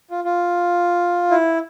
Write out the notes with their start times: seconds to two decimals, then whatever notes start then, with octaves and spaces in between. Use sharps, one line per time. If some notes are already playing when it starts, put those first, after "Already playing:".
0.11 F4
0.24 F4
1.31 E4